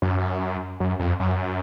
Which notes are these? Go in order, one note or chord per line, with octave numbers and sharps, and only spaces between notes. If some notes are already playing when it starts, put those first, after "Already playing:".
F#2
F#2
F2
F#2